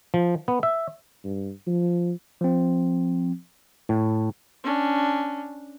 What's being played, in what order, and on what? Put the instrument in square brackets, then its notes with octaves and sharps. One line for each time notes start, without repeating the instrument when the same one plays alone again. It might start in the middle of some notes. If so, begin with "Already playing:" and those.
[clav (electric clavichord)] F3
B3
E5
[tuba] G2
F3
[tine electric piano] F3 C4
[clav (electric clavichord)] A2
[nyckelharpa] C#4 D4